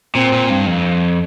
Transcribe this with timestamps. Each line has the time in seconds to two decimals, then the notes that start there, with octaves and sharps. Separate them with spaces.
0.15 A#2 C4
0.32 A#2
0.50 G2
0.66 F2